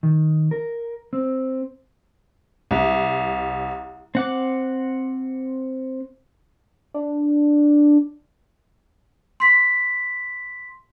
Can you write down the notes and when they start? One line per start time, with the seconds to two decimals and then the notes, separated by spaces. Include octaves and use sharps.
0.03 D#3
0.51 A#4
1.13 C4
2.71 C2
4.15 C4 F#5 D6
6.94 D4
9.40 C6 B6